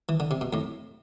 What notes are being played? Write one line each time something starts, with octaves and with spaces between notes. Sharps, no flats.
E3
D3
C3
B2
F2 A2